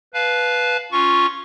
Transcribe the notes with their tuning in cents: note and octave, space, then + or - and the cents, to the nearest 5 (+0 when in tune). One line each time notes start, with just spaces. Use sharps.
B4 +0 F5 +0 A5 -30
C#4 +0 F4 +0 C#6 +0